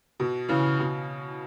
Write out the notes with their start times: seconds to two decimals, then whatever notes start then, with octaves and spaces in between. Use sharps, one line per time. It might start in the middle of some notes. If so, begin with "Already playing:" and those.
0.20 B2
0.48 C#3 E3
0.80 B2